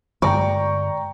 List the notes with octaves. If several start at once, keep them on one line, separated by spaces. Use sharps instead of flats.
G2 D3 G#3 D5 G5 A#5 C#6